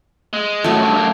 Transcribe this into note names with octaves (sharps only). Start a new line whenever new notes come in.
G#3
F#2 A2 A3 F#4
C#2 G2
F#2 A#3